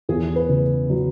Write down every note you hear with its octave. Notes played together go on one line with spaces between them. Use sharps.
E2 G#4
B4
C#3
F#3